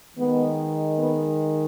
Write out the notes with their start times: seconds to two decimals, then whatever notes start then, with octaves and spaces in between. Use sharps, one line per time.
0.17 D#3 G#3 B3
0.98 B3